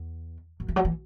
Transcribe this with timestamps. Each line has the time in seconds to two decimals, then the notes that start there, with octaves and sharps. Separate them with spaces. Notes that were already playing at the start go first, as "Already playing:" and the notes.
Already playing: E2
0.60 F#2
0.68 E3
0.76 F#3
0.85 E3